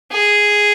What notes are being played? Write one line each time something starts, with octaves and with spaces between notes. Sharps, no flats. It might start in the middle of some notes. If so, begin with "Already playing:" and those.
G#4